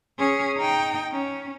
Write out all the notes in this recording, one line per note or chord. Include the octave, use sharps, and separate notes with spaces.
C#4 G#4
D#4 G5
C#4